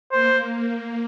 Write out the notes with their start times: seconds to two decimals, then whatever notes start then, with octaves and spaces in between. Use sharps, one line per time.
0.12 A#3 C5
0.57 A#3